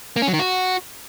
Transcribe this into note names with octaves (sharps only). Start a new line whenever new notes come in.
A#3
C#4
F#3
D#3
F#4